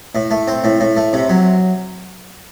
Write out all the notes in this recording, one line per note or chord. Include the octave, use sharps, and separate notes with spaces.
A2
A3
C4
A2
A2
A3
C3
F#3